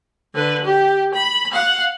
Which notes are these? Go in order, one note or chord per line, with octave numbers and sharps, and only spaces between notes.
D3 B4
G4
B5
F5 F#5